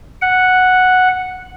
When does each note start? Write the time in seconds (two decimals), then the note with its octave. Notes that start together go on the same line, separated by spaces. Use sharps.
0.22 F#5